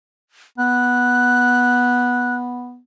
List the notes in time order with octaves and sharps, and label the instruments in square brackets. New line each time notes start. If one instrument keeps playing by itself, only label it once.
[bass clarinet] B3 [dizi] F#6